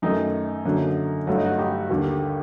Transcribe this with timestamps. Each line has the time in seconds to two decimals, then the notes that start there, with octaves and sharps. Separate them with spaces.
0.02 F#2 D#3 A3 D#4
0.65 F#2 D3 F#3 A#3
1.27 G2 F#3 A3 F#4
1.36 D#4
1.45 F#4
1.58 D#4 G4
1.90 D#2 D3 G3